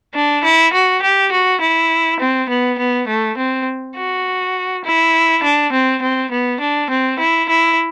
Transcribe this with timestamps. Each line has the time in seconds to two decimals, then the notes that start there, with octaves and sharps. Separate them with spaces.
0.15 D4
0.44 E4
0.73 F#4
1.02 G4
1.32 F#4
1.61 E4
2.20 C4
2.49 B3
2.79 B3
3.08 A3
3.38 C4
3.96 F#4
4.85 E4
5.43 D4
5.73 C4
6.02 C4
6.31 B3
6.60 D4
6.90 C4
7.19 E4
7.49 E4